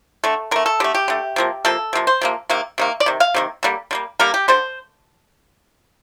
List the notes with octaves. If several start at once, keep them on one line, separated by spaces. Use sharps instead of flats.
D3 A3 A4
D3 A3 A#4
A4
D3 A3 G4
G4
D3 A3
C3 F3 A#3
C3 F3 A#3 A4
C3 F3 A#3
C5
C3 F3 A#3
C3 D#3 A#3
C3 D#3 A#3
D5
C3 D#3
F5
C3 D#3 A#3
D3 G3 A#3
D3 G3 A#3
D3 G3 A#3 A#4
G4
D3 G3 C5